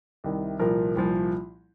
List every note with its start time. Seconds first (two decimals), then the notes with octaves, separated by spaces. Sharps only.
0.24 C2 C3 D#3
0.59 C2 A#2 F3 A#4
0.95 C2 A#2 F3